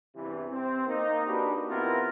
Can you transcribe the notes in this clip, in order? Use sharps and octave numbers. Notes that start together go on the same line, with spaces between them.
E2 G2 C3 E3
C4
A#3 D#4
A#3 D4 F#4 G4 B4
D#3 B3 C4 E4 F4 A#4